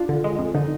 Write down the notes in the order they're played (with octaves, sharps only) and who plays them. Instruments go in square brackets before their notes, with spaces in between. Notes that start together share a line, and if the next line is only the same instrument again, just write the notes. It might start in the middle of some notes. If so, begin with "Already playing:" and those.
Already playing: [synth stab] D4 [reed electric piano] F4
[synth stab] D3
G#3
F2
[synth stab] D3 [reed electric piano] D#4